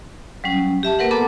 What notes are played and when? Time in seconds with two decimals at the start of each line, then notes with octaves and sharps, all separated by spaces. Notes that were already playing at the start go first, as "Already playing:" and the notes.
0.44 F#3 G3 C#4
0.83 G4 E5 A5
0.99 A#3 A#4 B4 F#5
1.11 B3 A4 F#5 A5 A#5 D6